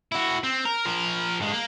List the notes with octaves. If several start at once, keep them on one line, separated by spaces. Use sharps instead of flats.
E4 F#4
C4
A#4
F3 A#4
G2 G#3
A#3